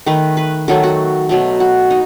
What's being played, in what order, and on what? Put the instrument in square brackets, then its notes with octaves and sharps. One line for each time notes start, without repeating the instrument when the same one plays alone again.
[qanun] D#3 A3 B4
B4
D#3 F#3 A3 A4
F#4
B2 F#3 A3
F#4
D#4